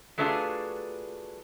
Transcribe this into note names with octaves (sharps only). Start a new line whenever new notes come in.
F#3 A3 B3 D4 F4 G#4